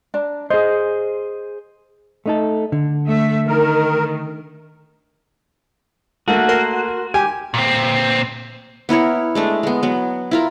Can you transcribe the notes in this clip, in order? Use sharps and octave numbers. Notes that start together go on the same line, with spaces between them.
D4 A#5
G#4 C5 D#5
A3 D#4 A4
D3
A3 E5
D#3 A3 A#4
A3 A#3 F#4
A#4 C6
G4 G#5
A#2 C4
B3 E4 A#4 C#5
G#3 A3 D4
G#3 B3
F#3 B3
E4 F4 A#4